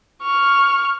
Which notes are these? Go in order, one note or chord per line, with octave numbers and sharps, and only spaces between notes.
C#6 F6